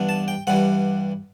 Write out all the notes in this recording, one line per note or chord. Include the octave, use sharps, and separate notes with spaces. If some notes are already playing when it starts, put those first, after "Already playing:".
Already playing: G2 E3 B3 D4
A5
G5
G2 E3 G3 F#5